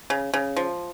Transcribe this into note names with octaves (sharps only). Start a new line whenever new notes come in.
C#3
C#3
F3